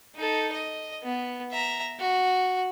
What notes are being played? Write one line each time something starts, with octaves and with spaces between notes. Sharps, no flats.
D#4 A4
D#5
B3
E5 A#5
F#4